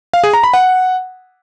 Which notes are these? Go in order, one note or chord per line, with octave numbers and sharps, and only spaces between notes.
F5
G#4
A#5
B5
F#5